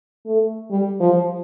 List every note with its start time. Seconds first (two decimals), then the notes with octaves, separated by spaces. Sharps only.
0.26 A3
0.71 G3
1.00 F3